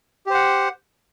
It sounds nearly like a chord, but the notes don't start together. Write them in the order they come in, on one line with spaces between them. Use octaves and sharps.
G4 C5 F#5